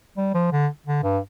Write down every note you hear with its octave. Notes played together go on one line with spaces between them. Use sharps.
G3
F3
D3
D3
G2